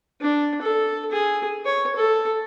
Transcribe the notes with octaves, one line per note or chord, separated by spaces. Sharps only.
D4
A4
G#4
C#5
A4